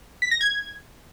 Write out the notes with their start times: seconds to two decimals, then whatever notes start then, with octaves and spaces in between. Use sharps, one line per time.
0.22 B6
0.31 A#6
0.41 G#6